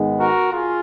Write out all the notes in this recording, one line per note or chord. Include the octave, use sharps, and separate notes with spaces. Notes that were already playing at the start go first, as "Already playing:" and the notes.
Already playing: G#2 D#3 G#3 B3
F#4 A#4
F4 G#4